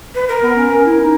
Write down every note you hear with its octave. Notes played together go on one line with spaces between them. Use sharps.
B4
A#4
B3
C#4
C#4
E4
D#4